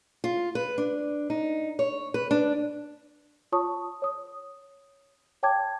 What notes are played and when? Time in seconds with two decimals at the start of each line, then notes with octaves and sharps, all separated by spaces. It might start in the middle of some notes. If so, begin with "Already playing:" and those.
0.24 F4
0.55 B4
0.78 D4
1.30 D#4
1.79 C#5
2.14 B4
2.31 D4
3.52 F4 C#5 A5 C#6 D#6
4.02 C#5 D#6
5.43 C#5 G5 A5 D6 G#6